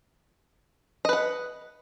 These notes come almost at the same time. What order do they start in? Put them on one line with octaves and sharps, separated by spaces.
D#5 B4 F#5